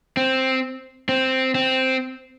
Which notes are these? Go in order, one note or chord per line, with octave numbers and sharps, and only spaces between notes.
C4
C4
C4